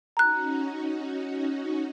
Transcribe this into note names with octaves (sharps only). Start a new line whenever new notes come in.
C#4 D#4 F#4 A#5 F#6